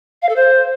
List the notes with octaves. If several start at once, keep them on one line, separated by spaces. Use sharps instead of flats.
F5
A4
C5